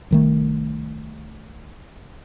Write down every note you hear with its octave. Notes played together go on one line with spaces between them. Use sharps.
C2 D#3 A3